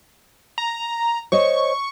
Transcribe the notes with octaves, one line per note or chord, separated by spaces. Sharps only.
A#5
C5 C#5 D#5 C#6